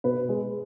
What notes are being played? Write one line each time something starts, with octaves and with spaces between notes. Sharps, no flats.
B2 B4
G#3